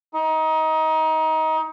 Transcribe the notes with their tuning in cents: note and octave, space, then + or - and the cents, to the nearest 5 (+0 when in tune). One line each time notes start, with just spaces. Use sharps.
D#4 +25